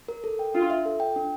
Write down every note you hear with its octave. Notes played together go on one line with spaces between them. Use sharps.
A#4
A4
G5
D4 F4
E5
A4
G5
D4